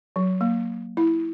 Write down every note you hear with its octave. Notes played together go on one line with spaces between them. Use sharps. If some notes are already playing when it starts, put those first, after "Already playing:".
F#3
A#3
E4